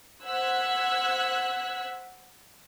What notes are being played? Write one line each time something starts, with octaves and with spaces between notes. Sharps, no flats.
C5 F#5 E6 F#6 G#6 B6